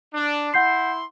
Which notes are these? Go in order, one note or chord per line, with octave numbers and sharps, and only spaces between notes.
D4
E4 F#5 C6 G6 C7